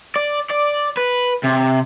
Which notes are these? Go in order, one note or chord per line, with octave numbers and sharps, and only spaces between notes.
D5
D5
B4
C3